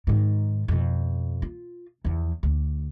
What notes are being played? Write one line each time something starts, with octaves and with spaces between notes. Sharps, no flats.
G#2 D#3
F2 B2
F4
E2 F3
D2